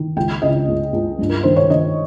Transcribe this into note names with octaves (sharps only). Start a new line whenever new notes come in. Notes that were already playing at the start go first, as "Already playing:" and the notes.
Already playing: D#3
C#2 G5
C#3 D#5
C#2
C#2
G2
A#4
D#3 C5
C#5
D#3 D#5